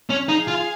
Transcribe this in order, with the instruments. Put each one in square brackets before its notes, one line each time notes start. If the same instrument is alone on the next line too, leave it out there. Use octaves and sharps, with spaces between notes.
[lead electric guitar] C#4
[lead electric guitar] D#4 [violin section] G#4 F5 G#5
[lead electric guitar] F4